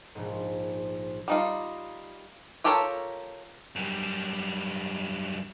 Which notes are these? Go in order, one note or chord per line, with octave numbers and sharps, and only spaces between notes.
A#1 G#2
G3 D#4 F4
F4 G4 A4 A#4 C#5
F#2 G3